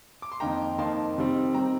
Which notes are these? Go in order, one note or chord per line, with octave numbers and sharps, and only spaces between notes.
D6
C6
F2 D#3 A#3 D#4 G5 A#5
F2 D#3 A#3 D#4 A5 C6
C3 D#3 G3 C4
C3 D#3 G3 C4 G5 A#5